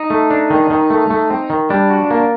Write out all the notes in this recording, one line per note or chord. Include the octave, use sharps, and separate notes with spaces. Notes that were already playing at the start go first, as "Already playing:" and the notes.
Already playing: D#4
A3
D4
D#3
D#3
A3
A3
C4
D#3
G3 D4
F#4
A#3